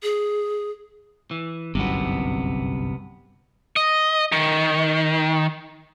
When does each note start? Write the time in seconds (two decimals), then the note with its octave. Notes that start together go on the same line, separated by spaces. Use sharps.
0.03 G#4
1.31 E3
1.75 G1 C2 F#2 C3 B3
3.76 D#5
4.32 D#3